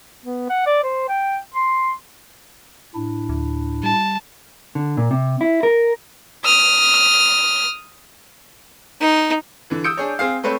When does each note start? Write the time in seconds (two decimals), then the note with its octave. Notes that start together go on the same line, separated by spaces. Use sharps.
0.24 B3
0.49 F#5
0.66 D5
0.83 C5
1.09 G5
1.54 C6
2.95 A2 D4 E4
3.29 D2
3.83 G3 A5
4.75 D3
4.97 A#2
5.11 C3
5.41 E4
5.63 A#4
6.45 D#6 F6
9.01 D#4
9.70 D3 E3
9.84 D#6 E6 G6 C#7 D7
9.97 D4 G#4 C#5
10.19 C4 G#4 F5
10.44 A3 C4 B4 C#5